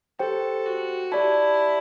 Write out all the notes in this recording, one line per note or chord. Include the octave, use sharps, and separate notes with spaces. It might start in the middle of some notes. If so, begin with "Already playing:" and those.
G4 A4 C5 G5
F#4
E4 G4 D5 A5